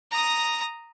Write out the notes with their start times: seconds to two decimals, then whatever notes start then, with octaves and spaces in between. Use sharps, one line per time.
0.11 A#5 D#6